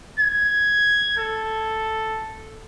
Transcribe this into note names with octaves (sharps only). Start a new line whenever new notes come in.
G#6
A4